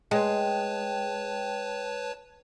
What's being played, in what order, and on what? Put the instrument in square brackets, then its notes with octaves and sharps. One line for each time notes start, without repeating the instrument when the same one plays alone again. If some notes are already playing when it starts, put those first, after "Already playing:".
[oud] G#3 [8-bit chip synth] B4 C#5 A5 [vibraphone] G5